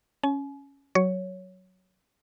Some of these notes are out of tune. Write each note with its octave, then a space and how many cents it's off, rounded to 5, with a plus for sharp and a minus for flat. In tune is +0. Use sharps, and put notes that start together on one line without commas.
C#4 +0 G#5 +40
F#3 +5 C#5 +5